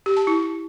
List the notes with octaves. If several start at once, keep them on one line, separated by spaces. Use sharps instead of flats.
G4
A5
E4